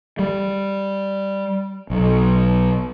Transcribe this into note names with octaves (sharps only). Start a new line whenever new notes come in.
G3
B1